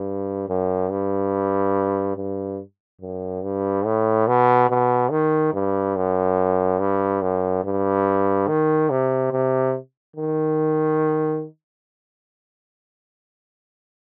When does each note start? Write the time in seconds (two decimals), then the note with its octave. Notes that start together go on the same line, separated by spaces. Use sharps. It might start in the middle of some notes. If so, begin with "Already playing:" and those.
Already playing: G2
0.49 F#2
0.91 G2
2.16 G2
3.01 F#2
3.43 G2
3.85 A2
4.27 B2
4.70 B2
5.11 D#3
5.53 G2
5.96 F#2
6.79 G2
7.22 F#2
7.64 G2
8.48 D#3
8.90 C3
9.32 C3
10.16 D#3